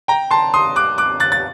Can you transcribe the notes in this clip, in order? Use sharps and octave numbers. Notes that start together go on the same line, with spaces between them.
G5 A#5
A5 C6
C6 D#6
D6 F#6
D6 F#6
F#6 A6
A6